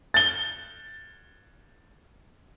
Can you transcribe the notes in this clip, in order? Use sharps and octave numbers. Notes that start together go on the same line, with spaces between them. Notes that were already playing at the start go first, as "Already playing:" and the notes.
A6 G7